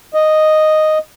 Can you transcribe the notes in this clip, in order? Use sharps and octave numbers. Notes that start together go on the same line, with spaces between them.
D#5